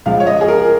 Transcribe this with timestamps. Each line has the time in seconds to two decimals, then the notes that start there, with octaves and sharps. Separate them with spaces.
0.06 C#2 C#3 F3 F5
0.20 C#5
0.27 D#5
0.41 G#4
0.48 A#4